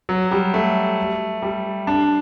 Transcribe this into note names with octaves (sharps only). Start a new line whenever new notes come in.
F#3
G3
A3
G3
D4